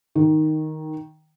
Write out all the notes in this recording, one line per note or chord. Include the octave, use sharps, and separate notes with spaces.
D#3